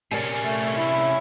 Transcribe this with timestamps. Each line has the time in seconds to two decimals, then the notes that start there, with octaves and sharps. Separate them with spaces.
0.11 C3 C#4 A#4 D5 G#5
0.45 A3
0.76 E4